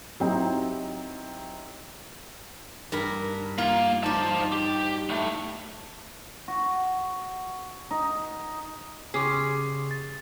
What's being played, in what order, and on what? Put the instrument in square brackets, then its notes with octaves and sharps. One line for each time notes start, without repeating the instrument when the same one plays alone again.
[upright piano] F#3 C4 D#4 E4 G4
[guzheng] G2 A#4 B5
[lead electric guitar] A#3 [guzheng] F4
[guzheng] D#4 D5 [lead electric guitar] C5 A5
[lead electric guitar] G4
A2 A3
[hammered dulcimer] F#4
D#4
[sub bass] C#3 [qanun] C#4 G4 [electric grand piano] G#4 [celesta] C6 D6 C7
[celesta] A6